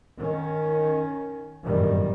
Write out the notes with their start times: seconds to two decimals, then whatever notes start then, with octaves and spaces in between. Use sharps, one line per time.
0.19 D#3 C#4
1.64 G1 F#2 A2 D#3 G3